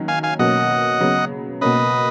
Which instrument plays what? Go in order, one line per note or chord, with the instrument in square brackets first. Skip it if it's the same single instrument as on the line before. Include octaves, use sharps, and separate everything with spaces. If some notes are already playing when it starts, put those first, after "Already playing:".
Already playing: [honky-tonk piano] D#3 F#3 C#4
[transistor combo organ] F5 G#5
F5 G#5
[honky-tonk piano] B2 F#3 A#3 C#4 [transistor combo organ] D#5 F#5
[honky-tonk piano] C#3 F#3 B3
[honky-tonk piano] B2 A#3 C#4 [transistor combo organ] B4 D#5